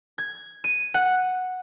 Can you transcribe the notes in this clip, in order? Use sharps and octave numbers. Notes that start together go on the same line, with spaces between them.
G#6
D#7
F#5